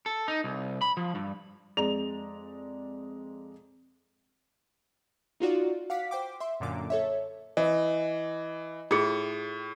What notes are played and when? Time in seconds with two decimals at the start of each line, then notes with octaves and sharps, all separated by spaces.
0.06 A4
0.28 D#4
0.44 C2
0.81 B5
0.97 F3
1.15 G2
1.77 F2 G#3 D5 A#5 F7
5.40 D#4 F4 F#4 D5
5.90 F5 F#5 D6 B6
6.11 C5 G5 D6
6.40 E5 C6
6.60 F#2 A#2 D3 D6
6.90 A4 C#5 E5
7.57 E3 D#5
8.91 A2 F4 G#4